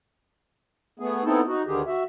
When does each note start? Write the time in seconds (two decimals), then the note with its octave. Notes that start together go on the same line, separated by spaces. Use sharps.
0.99 A3 B3 G#4
1.24 B3 C4 D#4 E4 A4
1.47 D#4 F#4
1.66 D2 D3 D#3 G4 G#4
1.87 F#4 E5